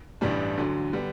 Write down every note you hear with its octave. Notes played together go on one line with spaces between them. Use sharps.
A1 G2 E3 G3 D4
D2 D3 F#3
D3 G3 B3